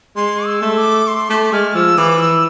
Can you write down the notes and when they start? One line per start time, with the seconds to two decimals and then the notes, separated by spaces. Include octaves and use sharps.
0.16 G#3 C6
0.46 E6
0.62 A3
0.77 D6
1.07 C6
1.29 A3 D6
1.52 G#3 F6
1.74 F3 E6
1.97 E3 D6
2.20 E6